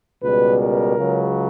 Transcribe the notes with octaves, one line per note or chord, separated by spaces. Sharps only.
C#2 B2 G3 B4
A#4
C#2 C#3 F#3